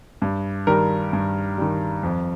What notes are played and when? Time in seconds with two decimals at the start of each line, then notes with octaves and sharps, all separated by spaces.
0.22 G2
0.67 D#3 G3 A#4
1.13 G2
1.58 D#3 G3
2.03 F2